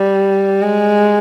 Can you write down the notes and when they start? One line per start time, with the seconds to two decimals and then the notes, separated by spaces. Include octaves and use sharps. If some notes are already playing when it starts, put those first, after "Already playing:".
Already playing: G3
0.61 G#3